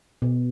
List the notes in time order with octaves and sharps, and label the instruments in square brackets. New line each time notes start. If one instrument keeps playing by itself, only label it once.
[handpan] B2